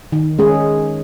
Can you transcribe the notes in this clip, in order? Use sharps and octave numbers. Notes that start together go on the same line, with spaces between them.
D#3
G#3 C#4 G#4